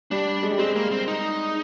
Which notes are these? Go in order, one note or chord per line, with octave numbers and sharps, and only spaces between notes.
G3 D4
G#3
G3
G#3 C4
A#3
C4
D#4